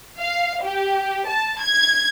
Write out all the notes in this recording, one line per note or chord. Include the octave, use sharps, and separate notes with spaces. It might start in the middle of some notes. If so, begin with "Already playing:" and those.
F5
G4
A5
G#6